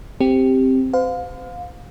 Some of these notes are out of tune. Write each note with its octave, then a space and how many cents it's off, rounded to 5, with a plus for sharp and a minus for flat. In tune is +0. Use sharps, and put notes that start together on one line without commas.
C4 +0 G4 +0
C5 -40 F5 +25